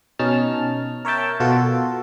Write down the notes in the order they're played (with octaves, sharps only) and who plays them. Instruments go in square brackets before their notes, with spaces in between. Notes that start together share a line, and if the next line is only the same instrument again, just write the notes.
[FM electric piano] B2 C#4 D#4 A5 F6
A#4 C#5 E5 G5 A5
B2 F4 F#4 A4